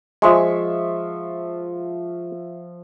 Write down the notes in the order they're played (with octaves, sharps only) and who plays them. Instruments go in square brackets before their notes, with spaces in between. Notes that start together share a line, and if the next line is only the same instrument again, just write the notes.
[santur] F3 E5 C#6 [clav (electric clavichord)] G#3